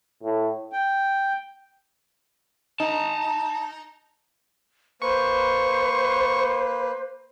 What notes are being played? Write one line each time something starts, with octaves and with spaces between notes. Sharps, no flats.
A2
G5
D#4 A5 A#5
A#3 B4 C5 C#6